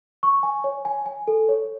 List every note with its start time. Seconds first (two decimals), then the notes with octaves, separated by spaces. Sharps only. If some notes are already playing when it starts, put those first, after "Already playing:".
0.23 C#6
0.43 G#5
0.64 C#5
0.85 G#5
1.06 G#5
1.28 A4
1.49 C#5